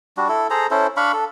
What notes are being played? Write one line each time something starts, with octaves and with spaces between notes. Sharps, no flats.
G3 D4 F#4
E4 A4
G#4 A4 C5 A#5
C#4 E4 A4 C5
D4 F5 B5 C#6
A4